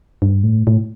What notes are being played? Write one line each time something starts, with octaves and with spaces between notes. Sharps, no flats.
G2
A2
A2